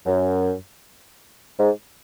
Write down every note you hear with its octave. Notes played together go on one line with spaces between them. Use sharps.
F#2
G#2